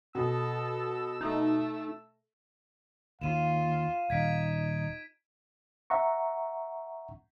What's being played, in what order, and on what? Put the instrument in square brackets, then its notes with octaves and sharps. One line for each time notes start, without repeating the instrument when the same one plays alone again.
[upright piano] B2 [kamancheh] A4 [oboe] E6
[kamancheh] A3 [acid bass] D#4
[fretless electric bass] D#2 [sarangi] F4 [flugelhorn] F5 [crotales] D#7 E7
[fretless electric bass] D#1 [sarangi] D#4 [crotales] G#6 B6 D7
[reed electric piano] E5 F#5 A#5 C#6